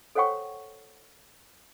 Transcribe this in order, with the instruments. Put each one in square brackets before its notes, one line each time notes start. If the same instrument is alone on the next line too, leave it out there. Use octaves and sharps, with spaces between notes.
[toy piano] A4 C5 C#5 F#5 G5 C#6